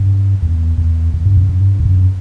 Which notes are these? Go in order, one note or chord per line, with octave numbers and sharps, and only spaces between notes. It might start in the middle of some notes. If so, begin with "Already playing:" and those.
Already playing: G2
E2
E2
E2
G2
F#2
F#2
G2
E2
F#2